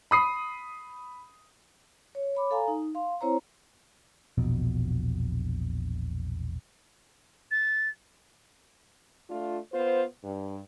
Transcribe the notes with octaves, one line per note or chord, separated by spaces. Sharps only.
B5 D#6 C7
C#5
C#5 B5 D6
A4 F5 G#5 A#5
D#4
F5 C6
C4 E4 C5 C#5 A#5
E1 A#1 B2
A6
A3 D4 F4
B3 F4 C5
G2